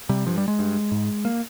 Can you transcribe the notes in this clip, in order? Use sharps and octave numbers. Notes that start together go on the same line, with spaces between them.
C3 G3
G2 F3
G3
G#3
G2
G#2
A#3